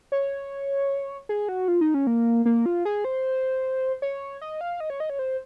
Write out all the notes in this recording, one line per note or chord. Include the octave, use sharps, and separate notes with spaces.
C#5
G#4
F#4
F4
D#4
C#4
A#3
A#3
F4
G#4
C5
C#5
D#5
F5
D#5
C#5
D#5
C#5
C5